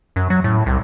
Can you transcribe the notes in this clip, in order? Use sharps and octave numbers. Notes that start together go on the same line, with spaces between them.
F#2
F#3
A2
C2